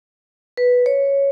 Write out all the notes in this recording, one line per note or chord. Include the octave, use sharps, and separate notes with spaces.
B4
C#5